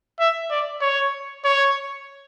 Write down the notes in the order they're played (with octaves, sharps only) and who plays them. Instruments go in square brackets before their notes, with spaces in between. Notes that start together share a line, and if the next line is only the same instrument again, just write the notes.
[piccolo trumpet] E5
D5
C#5
C#5